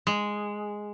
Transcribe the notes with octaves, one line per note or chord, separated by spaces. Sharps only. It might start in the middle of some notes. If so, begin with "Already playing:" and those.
G#3